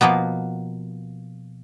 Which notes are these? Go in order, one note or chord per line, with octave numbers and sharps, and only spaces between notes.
B2 F3 A#3 B3